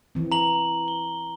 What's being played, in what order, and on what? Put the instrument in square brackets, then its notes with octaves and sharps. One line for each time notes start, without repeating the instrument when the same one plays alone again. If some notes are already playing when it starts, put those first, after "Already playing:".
[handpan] E3 C4
[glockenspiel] A#5 F#7
G7